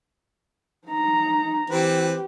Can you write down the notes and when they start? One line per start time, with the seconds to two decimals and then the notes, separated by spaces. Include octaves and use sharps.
0.88 D#4 A#5
1.70 E3 C4 G4 B4